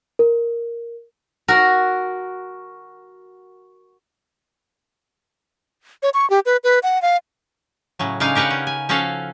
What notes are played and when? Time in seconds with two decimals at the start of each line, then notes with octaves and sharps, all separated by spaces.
0.19 A#4
1.48 F#4 A#4
6.03 C#5
6.14 C#6
6.30 G4
6.46 B4
6.64 B4
6.83 F#5
7.02 F5
7.99 A2 C#3 F#3
8.20 C#3 G#3 D4 D#4 F5 A#5
8.35 G4 A#4 B4 F5 F#5
8.50 C#4
8.67 G#5
8.89 F3 C#4 F#4 A4 F5